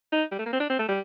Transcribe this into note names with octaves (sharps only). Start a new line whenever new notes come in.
D#4
G3
A3
A#3
C4
D4
C4
A3
G3